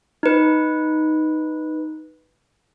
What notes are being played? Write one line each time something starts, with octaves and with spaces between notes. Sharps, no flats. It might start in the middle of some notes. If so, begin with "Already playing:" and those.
D#4 B4